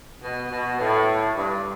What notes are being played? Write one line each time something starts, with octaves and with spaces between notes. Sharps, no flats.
B2
B2
A2
G2